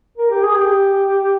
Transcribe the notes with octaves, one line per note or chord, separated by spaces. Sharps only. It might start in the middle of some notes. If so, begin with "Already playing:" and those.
A#4
G4
G#4
G4